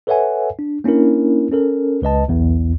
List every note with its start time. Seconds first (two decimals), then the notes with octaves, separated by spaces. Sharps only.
0.07 A4 B4 C#5 E5 F#5 G#5
0.59 D4
0.84 A#3 C#4 D4 E4 A#4
1.52 C#4 A4 A#4
2.02 C#2 B4 D#5 A5
2.28 B1 E2